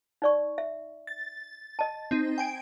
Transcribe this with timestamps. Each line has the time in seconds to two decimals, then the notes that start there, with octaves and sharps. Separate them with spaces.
0.22 D#4 D5 C#6
0.58 E5
1.07 A6
1.79 D#5 A5
2.11 C4 D#4
2.38 G5 G#5 D7